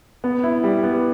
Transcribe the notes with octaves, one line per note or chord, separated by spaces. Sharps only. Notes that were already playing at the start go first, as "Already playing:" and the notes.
B3
E4
G3
B3